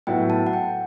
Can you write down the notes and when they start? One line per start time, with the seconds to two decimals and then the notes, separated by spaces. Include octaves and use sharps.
0.07 A2 F#3 B3 E4 G5
0.30 A5
0.47 F#5
0.53 G5